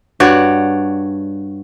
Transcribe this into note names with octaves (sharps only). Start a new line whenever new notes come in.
G2 F#4 C#5 D5